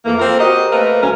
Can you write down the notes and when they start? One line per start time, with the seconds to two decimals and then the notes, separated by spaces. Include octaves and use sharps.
0.05 F2 E3 A3 A#3
0.19 C4 F4 A4 A#4 C5
0.39 F#4 G4 A#4 C5 D#5
0.72 A3 A#3 C4 A#4 B4
1.01 D2 F#3 A3 C#4 A#4